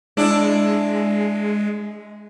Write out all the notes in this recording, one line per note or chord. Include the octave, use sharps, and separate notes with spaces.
G#3 D4 E4